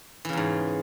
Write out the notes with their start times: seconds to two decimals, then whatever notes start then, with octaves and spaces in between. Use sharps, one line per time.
0.25 E3
0.29 C#3
0.33 E2
0.37 G#2